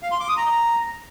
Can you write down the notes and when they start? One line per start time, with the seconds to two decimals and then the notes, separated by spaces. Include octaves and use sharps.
0.03 F5
0.11 C6
0.20 D6
0.29 D#6
0.37 A#5